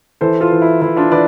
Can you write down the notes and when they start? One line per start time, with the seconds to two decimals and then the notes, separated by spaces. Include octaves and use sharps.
0.21 E3 A4 C5
0.41 F4 A4
0.52 E3
0.62 E4
0.82 E3 E4
0.96 D4 F4
1.12 E3 B4 D5